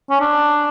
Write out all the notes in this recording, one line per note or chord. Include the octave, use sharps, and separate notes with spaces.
C#4
D4